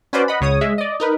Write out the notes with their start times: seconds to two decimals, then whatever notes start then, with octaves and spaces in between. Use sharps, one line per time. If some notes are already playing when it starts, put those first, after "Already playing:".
0.13 C#4 F#4 B4 C5 D5
0.28 D#5 F#5 B5
0.41 C#2 C#3 C#5 D#6
0.61 G#3 E5
0.78 D5 D#5
1.00 D#4 A#4 B4